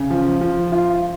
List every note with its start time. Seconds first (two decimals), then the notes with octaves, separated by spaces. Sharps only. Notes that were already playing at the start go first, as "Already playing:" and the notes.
Already playing: C#3
0.10 F3
0.41 F3
0.72 F4